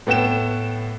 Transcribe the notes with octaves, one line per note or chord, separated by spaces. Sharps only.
A2 B3 G5 E7